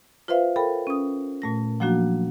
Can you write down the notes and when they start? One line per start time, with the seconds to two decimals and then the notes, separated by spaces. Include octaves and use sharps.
0.28 F4 B4 C5 E5 F5
0.56 A4 A#4 G5 B5
0.87 C#4 D#6
1.42 A#2 A3 A#6
1.80 F3 F#3 A#3 D4 F#4